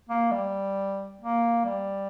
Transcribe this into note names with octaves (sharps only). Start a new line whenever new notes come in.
A#3
G3
A#3
G3